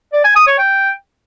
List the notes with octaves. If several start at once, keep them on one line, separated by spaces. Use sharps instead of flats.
D5
G#5
D#6
C#5
G5